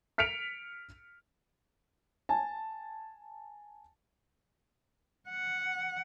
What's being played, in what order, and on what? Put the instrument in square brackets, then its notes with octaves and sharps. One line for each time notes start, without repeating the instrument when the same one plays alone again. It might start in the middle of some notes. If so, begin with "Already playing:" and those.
[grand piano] F6 B6 C#7 D7 F7
[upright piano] G#5 A5
[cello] F#5